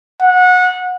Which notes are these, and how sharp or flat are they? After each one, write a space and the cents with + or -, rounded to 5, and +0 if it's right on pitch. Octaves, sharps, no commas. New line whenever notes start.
F#5 -25